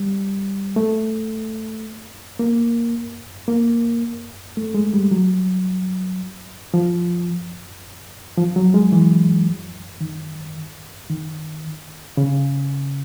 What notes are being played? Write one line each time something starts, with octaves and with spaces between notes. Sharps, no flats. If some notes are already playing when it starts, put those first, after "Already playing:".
Already playing: G3
A3
A#3
A#3
A3
G#3
G3
F#3
F3
F3
F#3
G#3
E3
D#3
D#3
C#3